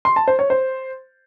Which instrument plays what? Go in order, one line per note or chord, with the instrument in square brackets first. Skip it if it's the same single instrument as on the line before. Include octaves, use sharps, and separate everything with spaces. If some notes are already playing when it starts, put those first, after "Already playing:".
[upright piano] C6
A5
C5
C#5
C5